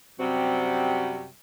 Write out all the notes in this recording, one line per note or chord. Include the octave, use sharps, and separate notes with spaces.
F#2 C3 G3 C4 F#4